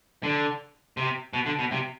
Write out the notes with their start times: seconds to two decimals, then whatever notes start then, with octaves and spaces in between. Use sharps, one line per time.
0.23 D3
0.97 C3
1.33 B2
1.46 D3
1.59 B2
1.72 C3